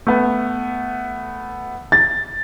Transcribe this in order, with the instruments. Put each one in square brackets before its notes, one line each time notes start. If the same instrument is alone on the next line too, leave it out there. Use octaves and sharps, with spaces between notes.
[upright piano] A3 B3
[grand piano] A6